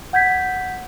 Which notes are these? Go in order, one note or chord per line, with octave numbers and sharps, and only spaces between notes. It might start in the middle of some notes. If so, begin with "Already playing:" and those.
F#5 G6 G#6 B6